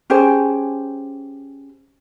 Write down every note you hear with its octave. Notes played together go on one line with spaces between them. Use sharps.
C#4 G4 G#4 C5